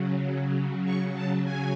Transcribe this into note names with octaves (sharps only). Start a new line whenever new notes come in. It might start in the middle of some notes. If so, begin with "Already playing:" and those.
Already playing: C#3 F#3
C#6
A5
G#5